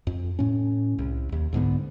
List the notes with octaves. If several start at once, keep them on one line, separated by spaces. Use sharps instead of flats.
F2
A2 C#4
C2
D#2
C2 G#2 D3 B3